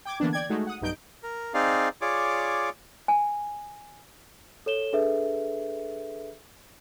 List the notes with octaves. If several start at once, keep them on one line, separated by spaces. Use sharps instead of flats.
G5 D6 G#6
D3 E3 A#3 B3 D4
D5 G5 G#6
G#3 A3 D#4 F#4
F#5 D#6
B1 G2 D#4 G6 D7
A#4
C4 D#4 G#4 D5 F5
F4 G#4 C#5 D5 D6
G#5
A4 C#5 E7 G7
D4 G#4 A4 B4 E5